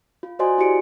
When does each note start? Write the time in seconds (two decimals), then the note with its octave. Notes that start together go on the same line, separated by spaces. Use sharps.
0.23 F4
0.39 F#4 C5 D5 D#5 G#5 C6
0.58 E4 F#4 G4 D5 C#7 D7